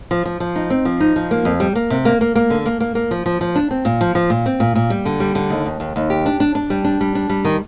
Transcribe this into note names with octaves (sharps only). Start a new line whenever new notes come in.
F3
F3
F3
D#4
C4
F3
D#4
F3
A#3
F2
G3
A#3
C3
A#3
A#3
A#3
D3
A#3
A#3
A#3
F3
F3
F3
D4
C4
A#2
F3
F3
A#2
C4
A#2
A#2
G3
D3
G3
D3
D#2
D#2
D#2
D#2
G4
D4
D4
D4
G3
D4
G3
D4
G3
D#3